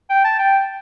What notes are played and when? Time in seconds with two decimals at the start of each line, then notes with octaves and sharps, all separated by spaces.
0.10 G5
0.24 A5
0.39 G5